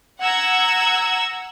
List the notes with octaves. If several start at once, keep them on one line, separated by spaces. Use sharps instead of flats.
F#5 A#5 E6 G#6